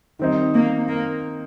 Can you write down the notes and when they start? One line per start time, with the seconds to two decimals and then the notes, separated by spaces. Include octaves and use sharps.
0.19 D#3 G3 C4 D#4
0.54 A#3
0.88 A#3